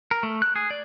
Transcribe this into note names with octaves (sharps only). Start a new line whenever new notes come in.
A#4
A3
F#6
G#4
D5